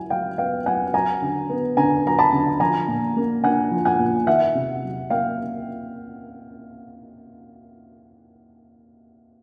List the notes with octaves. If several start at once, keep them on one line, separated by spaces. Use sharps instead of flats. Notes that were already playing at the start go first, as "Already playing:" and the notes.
Already playing: F#3 E4 G#5
F#3 F5 G5
B3 F5 G5
F#3 F#5 G#5
F#3 G#5 A#5
D3
B3
D3 G#5 A#5
F#3 A#5
A5 B5
D3
F3 G#5 A#5
A#2
A#3
D4 F#5 G#5
F3
F#5 G#5
A#2
D#3 E5 F#5
C3
F#3
A#3 F5 G5